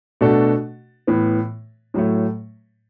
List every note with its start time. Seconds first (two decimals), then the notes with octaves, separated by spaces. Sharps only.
0.21 B2 A3 D4 F#4 A4
1.07 A2 E3 B3
1.94 A2 F#3 A3